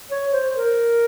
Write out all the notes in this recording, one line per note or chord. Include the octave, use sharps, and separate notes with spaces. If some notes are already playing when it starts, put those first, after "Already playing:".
C#5
C5
A#4